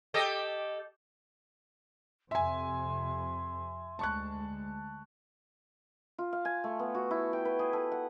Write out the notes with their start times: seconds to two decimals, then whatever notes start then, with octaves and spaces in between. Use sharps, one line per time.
0.14 G4 A4 D#5
2.31 F2 C3 E5 G#5 C6
3.99 D2 G#3 A5 C#6 F#6
6.18 F4
6.33 F5
6.45 G#5
6.64 A3
6.79 B3
6.95 F#4
7.11 E4
7.33 G5
7.45 B4
7.59 G#4
7.73 A4
7.92 F#5